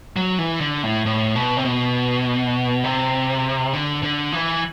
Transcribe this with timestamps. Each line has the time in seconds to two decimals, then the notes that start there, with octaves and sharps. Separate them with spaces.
0.16 F#3
0.38 E3
0.60 D3
0.83 A2
1.06 A2
1.35 B2
1.57 C3
1.65 B2
2.84 C3
3.73 D3
4.03 D3
4.33 E3